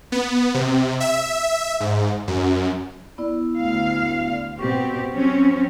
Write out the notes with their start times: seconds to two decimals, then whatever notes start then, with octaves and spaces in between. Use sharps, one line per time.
0.12 B3
0.54 C3
1.00 E5
1.80 G#2
2.28 F#2
3.18 B3 E4 D5
3.59 D2 F5
4.59 B2 C4 G4 C#6
5.13 F#3 C4 C#4